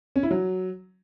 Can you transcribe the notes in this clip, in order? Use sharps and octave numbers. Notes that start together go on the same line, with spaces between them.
C#4
E4
F#3